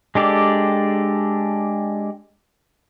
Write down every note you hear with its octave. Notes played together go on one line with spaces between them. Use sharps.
G#3 D4 G4 A4 D5